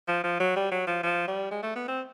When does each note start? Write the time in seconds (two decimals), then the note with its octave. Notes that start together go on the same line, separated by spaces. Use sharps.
0.08 F3
0.24 F3
0.40 F#3
0.56 G3
0.72 F#3
0.87 F3
1.04 F3
1.28 G3
1.51 G#3
1.63 A3
1.76 B3
1.88 C4